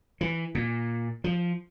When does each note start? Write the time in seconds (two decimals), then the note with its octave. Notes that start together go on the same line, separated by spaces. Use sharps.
0.21 E3
0.55 A#2
1.24 F3